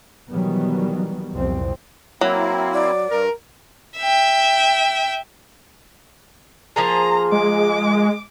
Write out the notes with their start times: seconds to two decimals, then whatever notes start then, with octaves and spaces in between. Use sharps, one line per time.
0.30 B2 D#3 E3 F#3 G3 B3
1.32 C2 F2 A#2 C4
2.21 F#3 A#3 C4 E4
2.74 D5
3.09 G2 A#4
3.97 E5 G5
6.76 F3 A#3 G#4 A#5
7.32 G#3 D6